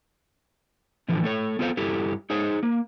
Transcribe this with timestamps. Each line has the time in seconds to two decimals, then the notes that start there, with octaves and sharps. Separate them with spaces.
1.08 A2 D3 E3 F3
1.24 A3 A4 C#5
1.59 B3 F4 A4 C5 F5
1.77 G2 E4 G4 A4
2.30 D#4 G#4 C5 C#5
2.63 A#3